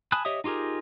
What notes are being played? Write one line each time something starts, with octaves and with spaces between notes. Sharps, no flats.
G#5 A5 B5 D#6 F#6
G4 C#5 D#5 E5 D#6
D#4 F4 G4 G#4 A#4